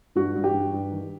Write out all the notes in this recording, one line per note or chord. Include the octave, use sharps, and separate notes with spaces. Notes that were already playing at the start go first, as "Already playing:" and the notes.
G2 F#4
G2
G4
G2
G2
D#3